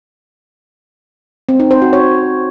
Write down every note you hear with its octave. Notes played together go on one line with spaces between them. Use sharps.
C4
D#4
C5
F#4
C#5